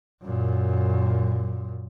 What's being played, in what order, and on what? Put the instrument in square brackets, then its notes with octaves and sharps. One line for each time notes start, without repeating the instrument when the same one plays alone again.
[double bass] F#2 A#2